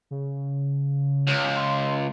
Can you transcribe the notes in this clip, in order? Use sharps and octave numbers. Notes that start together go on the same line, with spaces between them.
C#3
C#2
C6